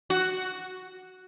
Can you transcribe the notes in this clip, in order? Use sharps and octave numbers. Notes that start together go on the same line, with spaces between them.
F#4